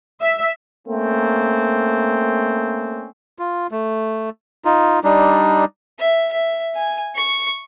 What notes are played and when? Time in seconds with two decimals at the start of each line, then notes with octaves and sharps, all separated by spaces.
0.21 E5
0.87 A3 A#3 C4 C#4
3.39 F4
3.71 A3
4.65 D#4 F4
5.04 G3 D4 D#4
5.99 E5
6.32 E5
6.75 G#5
7.16 C#6